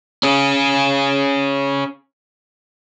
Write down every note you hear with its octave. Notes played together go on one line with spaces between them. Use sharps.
C#4 G#4